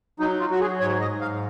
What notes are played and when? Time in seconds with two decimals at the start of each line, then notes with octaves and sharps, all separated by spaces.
0.20 F#3 D#4
0.40 F4
0.49 F#3 F#4
0.60 G#4
0.80 G#2 C#5
1.01 D#5
1.11 G#2
1.21 F5